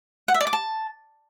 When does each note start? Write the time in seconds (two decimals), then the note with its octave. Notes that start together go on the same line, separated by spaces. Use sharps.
0.28 F#5
0.34 E5
0.41 D5
0.47 D6
0.53 A5